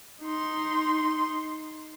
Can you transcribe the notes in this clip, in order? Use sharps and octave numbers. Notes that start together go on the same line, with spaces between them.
D#4 C6